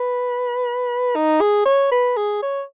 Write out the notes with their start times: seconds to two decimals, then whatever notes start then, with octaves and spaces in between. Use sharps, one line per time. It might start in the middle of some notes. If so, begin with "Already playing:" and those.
Already playing: B4
1.15 D#4
1.41 G#4
1.65 C#5
1.91 B4
2.17 G#4
2.42 C#5